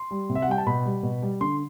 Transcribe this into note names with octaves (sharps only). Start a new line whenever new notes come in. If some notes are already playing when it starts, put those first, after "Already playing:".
Already playing: C6
G3
C3
E5
F#5
G3 G5
A5
B2 B5
G3
B2
G3
D3 C6